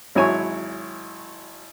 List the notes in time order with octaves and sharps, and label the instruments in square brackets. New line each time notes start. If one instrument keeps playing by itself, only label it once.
[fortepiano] G#1 F#3 E4 C#5 G#5 C#6